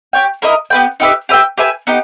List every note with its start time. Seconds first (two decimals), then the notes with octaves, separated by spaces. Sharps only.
0.13 G4 C#5 G5
0.42 A#3 E4 A#4 D#5
0.70 B3 G4 B4 G5
1.00 D#4 G4 B4 E5
1.29 G4 B4 E5 G5
1.58 G4 B4 E5 G#5
1.87 B3 D#4 G4